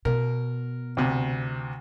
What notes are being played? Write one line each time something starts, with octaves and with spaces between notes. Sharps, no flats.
B2 A#4
D2 C3